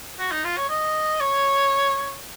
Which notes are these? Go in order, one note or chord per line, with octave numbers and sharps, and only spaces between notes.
F#4
D#4
F4
C#5
D#5
C#5